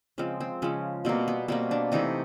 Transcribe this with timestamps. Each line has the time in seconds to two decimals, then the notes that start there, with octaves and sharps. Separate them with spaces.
0.18 C#3 F3 G#3 C4
0.40 C4
0.62 C#3 F3 G#3 C#4
1.05 B2 G3 A#3 C4
1.28 B3
1.48 B2 G3 A#3 C4
1.71 D4
1.92 C3 E3 A3 D#4